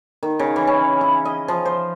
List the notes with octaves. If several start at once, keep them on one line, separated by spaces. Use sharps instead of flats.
D#3
C#3
E3
C#4
E4
D#5
F3
C5